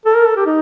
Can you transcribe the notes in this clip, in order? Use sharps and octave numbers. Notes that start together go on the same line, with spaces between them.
A4
A#4
A4
G4
D#4